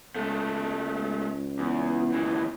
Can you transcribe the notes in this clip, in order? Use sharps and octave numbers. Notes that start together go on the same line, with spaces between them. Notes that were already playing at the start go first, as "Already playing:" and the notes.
C#2 G#3 A3
E2
D#2 E3